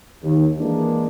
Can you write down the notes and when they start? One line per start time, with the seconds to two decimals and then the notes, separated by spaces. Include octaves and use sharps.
0.24 D#2
0.59 E3 G#3 A#3 D4